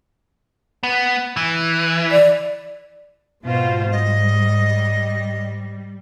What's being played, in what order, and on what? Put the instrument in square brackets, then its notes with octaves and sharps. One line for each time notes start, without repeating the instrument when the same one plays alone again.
[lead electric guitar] B3
E3
[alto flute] D5
[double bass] G#2 [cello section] B2 F4 C5
[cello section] G3 [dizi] D#5